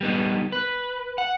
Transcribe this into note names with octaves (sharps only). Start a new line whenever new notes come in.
G3 B3 D#4
B4
F#5